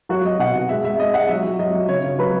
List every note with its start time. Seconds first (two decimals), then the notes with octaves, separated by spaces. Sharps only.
0.09 F#3 F#4
0.25 F#3 D#5
0.39 B2 F#5
0.55 B2
0.69 G#3 E5
0.84 G#3 E5
1.00 G#3 D#5
1.14 G#3 F#5
1.29 F#3 E5
1.45 F#3
1.59 F#3 D#5
1.74 F#3
1.88 C#3 C#5
2.03 C#3
2.19 F#3 B4